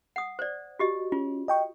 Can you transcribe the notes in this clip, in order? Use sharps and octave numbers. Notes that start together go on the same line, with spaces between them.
F#5 D#6
C5 D5
F#4 G4 D#5
C#4 F4
D#5 G5 C#6